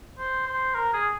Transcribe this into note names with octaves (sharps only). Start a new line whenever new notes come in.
C5
C5
A#4
G#4